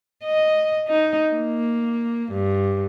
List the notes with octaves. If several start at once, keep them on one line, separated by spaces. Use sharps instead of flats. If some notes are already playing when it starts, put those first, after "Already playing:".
D#5
D#4
A#3
G2